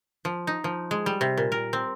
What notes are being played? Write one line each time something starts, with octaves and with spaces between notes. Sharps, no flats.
F3
D#4
F3
G#3
G3
C3
A#2
A#4
C4